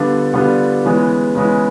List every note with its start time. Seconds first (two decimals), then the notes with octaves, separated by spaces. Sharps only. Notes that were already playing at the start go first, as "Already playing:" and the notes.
Already playing: D3 G3 B3 D4 F4
0.34 D3 G3 B3 D4 F4
0.84 C#3 E3 G#3 B3
1.35 C#3 E3 G#3 B3